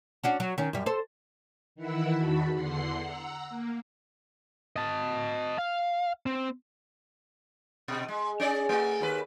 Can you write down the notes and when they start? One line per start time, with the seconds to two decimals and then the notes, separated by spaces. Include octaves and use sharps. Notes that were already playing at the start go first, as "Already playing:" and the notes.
0.24 C#4 D4 F#4
0.40 F#3
0.58 D#3 C#4
0.73 F#2 G3
0.86 A4 C5
1.76 D#3 E3 E4 F#5 B5 E6
2.16 E2 D#3 F#4 A5 B5 B6
2.54 E2 D3 F#5 C6 C7
3.01 F#5 A#5 E6
3.49 A#3
4.76 D#5 A5
5.58 F5
6.26 C4
7.88 B2
8.08 G#3
8.40 C#4 G#4 D5
8.69 A3 F#4
9.01 D#2 A#4 B4